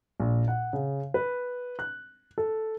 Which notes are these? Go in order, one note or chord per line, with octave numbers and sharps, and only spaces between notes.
A#1
F#5
C#3
B4
F#6
A4